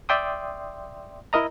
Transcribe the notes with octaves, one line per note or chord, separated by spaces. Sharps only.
D5 E5 G5 C6 D#6
E4 A#4 D#5 A#5